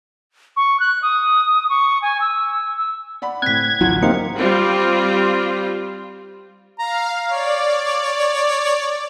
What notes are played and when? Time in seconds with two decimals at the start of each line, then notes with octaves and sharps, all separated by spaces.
0.57 C#6
0.80 F#6
1.02 D#6
1.69 C#6
2.02 G#5
2.21 E6
2.78 E6
3.22 D5 F#5 B5
3.42 A2 C4 F#6 G#6 B6
3.81 A1 D2 F#3 F4 F#5
4.03 A#3 C4 D#4 G4 F5 C#7
4.37 G3 C4 F4
6.79 F5 A#5
7.30 C#5 D5